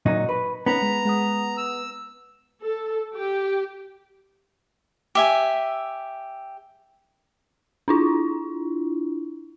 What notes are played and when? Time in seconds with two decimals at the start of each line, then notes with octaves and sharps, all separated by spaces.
0.06 A#2 F#3 D#4 C#6
0.29 B4
0.66 B3 C#4 D#4 A#5
0.82 G#3
1.05 G#3 F#5 D#6
1.57 E6
2.63 A4
3.14 G4
5.15 G4 E5 G#5
7.88 D4 E4 F4